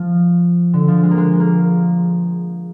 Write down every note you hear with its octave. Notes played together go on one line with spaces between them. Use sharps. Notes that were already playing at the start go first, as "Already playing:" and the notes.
Already playing: F3
D3
F3
G#3
A#3
G#3
A#3